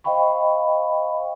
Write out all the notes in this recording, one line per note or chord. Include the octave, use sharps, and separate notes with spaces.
C5 D#5 F5 G5 B5 C#6